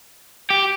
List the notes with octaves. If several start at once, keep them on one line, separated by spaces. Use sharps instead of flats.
G4